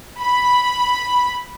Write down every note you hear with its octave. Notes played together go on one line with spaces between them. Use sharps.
B5